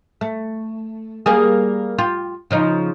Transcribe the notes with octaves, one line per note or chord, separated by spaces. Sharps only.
A3
G3 A#3 G#4
F4 G4
C#3 F3 D#4